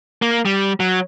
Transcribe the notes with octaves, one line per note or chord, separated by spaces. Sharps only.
A#3
G3
F#3